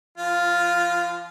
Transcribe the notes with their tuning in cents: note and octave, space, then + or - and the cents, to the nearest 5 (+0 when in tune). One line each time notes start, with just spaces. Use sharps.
F3 -30 F4 +0